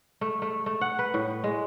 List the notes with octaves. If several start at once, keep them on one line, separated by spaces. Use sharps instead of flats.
A3
A3
A3
F#5
B4
A2
G#3